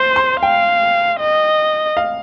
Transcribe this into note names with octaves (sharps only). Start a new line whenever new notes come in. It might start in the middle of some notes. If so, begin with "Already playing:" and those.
Already playing: C5 C6
C6
F5 G5
D#5
F5